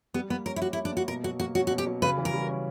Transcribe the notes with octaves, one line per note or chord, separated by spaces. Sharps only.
G3 B3
A#3 B3
C#4 A#4
E4
F#4 G4
E4
G3
D4
A#3 F#4
B2 A#4
F#3 F#4
A#3 F#4
C#4 F#4
F#4
B2
G4
F#3
C#3 B4
E3
A#4
G3
C#4